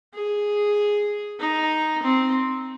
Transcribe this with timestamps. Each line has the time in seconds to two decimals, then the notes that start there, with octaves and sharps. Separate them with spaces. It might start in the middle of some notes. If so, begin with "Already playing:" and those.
0.14 G#4
1.40 D#4
2.03 C4